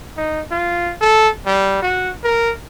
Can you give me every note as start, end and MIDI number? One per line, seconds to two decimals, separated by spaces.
0.17 0.41 63
0.51 0.93 65
1.01 1.29 69
1.46 1.78 55
1.82 2.10 66
2.24 2.52 70